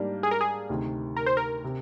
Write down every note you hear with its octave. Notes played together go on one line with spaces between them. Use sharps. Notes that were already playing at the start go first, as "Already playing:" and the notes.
Already playing: G#2 G3 A#3 D4 G4
G#4
A#4
G#4
D2 C3 D#3
A#4
C5
A#4
C3